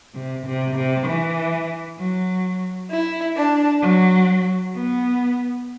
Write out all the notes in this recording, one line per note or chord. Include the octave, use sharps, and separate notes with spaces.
C3
C3
C3
E3
F#3
E4
D4
F#3
B3